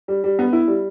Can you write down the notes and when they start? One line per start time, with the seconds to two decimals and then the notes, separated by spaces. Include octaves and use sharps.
0.08 G3
0.24 G3
0.39 B3
0.53 E4
0.67 G3